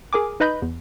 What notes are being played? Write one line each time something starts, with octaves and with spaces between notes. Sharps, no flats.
G#4 A#4 G#5 D6
D#4 B4 D#5 B5 G6
E2